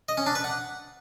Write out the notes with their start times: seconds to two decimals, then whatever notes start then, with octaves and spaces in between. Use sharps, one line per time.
0.09 D#5
0.17 C#4
0.26 D4
0.35 B4
0.44 F#5